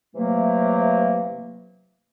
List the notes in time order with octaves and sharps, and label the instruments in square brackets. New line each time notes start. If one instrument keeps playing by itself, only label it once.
[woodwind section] C3 E3 F#3 A3 A#3